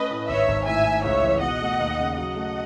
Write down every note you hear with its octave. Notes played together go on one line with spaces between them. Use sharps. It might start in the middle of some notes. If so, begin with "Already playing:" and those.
Already playing: A3 C#4 B4 D#5
A2
G#1 C#5 E5
G#1
A2 E5 G#5
A2
C#2 C#5 E5
E3
B2 D#5 F#5
A3
D#2
C#3
F#3 D#5 F#5
A3